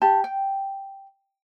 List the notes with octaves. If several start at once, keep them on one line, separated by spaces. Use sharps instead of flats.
G4 A5
G5